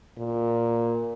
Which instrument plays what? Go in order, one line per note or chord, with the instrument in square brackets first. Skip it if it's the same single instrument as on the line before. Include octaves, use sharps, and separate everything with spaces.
[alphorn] A#2